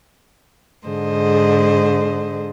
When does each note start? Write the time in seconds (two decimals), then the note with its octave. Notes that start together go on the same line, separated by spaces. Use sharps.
0.87 G#2 D3 G#4 C5 D#5